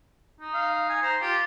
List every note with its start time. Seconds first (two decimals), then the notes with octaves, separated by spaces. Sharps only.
0.40 D#4
0.54 F5
0.89 G#5
1.02 C5 A#5
1.21 F4 G4